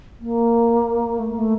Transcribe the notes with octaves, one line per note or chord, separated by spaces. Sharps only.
A#3
A3
A3